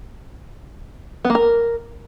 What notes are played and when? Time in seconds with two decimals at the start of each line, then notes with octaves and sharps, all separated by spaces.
1.25 B3
1.30 A#3
1.35 A#4